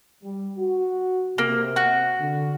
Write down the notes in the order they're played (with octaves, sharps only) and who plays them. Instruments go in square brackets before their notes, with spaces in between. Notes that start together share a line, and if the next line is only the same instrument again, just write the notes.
[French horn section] G3
F#4
[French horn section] C3 [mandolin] A#3
[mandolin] F#4
[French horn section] D3